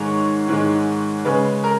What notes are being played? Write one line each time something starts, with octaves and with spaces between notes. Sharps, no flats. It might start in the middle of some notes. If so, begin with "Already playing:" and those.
Already playing: G#2 D#3 G#3 C#5
G#2 D#3 G#3
C#3 G#3 C#4 B4
A#4